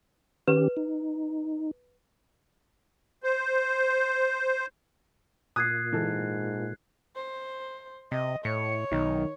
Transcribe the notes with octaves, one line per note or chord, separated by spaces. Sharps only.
D#3 C#4 G4 B4
D#4
C5
A#2 D#6 F#6 G#6 C7
G#2 E3 A4
C5
C3 D#5
A2 C#5 C#7
B1 D#3